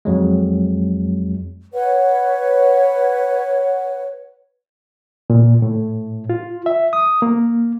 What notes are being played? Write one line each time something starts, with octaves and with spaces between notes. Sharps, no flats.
F2 F#3 G#3
B4 C#5 F#5
A#2
A2
F4
E5
D#6
A#3